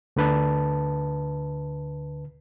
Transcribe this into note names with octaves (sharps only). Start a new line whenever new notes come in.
D2 D3 B4 A5